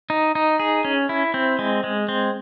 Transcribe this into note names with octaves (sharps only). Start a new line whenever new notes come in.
D#4
D#4
G#4
C#4
E4
C4
G#3
G#3
C4